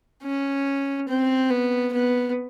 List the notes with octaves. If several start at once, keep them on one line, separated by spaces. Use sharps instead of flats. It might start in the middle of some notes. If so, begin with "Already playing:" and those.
C#4
C4
B3
B3